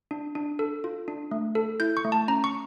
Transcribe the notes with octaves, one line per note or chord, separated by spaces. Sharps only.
D4
D4
A4
F4
D4
A3
A4
E4 G6
C#6
A3
A5
C#4 A#5
C#6